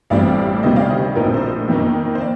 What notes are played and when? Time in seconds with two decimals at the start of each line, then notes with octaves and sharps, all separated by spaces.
0.10 A1 A2 G3 C4 D5 F5
0.63 D2 C3 D#3 G3 C5 D#5
0.76 D5 F5
0.90 C5 D#5
1.15 A#1 A2 F3 C4 D#4 A#4
1.34 C5
1.68 F2 D#3 A#3 D#4
2.15 C5
2.21 D5